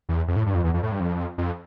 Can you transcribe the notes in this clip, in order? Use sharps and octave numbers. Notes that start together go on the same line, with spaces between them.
E2
F2
A2
G2
F2
E2
F2
A2
G2
F2
F2